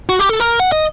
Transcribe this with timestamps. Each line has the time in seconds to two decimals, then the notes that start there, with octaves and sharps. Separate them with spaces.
0.09 F#4
0.19 G4
0.29 A4
0.40 A#4
0.60 F#5
0.72 D#5